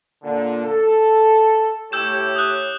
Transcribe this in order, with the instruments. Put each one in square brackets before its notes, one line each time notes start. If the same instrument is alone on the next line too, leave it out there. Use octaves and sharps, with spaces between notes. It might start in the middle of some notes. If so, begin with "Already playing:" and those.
[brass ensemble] A#2 D3
A4
[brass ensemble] A2 G4 C#5 [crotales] E6 G6 E7
[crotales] D#6 F#6